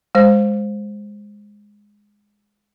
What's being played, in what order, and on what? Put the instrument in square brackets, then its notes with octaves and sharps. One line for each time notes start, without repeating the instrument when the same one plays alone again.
[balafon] G#3 C5